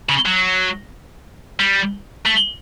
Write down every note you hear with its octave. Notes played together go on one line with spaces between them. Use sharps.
C#3
F#3
G3
A3